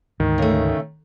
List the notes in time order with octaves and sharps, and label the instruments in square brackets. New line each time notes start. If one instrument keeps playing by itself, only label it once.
[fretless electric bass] D2 G#2 [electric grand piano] D#3
[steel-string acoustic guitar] C#3 A3